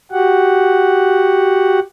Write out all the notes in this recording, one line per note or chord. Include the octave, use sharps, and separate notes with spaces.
F#4 G4 F#5